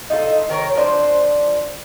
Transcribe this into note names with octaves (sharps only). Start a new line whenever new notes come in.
D#4 F4 A4
D#3 A#4 C#5
F3 D4 C5